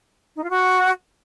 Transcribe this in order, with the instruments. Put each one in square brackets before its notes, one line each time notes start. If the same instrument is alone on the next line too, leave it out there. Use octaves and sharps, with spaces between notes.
[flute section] D#4
F4
F#4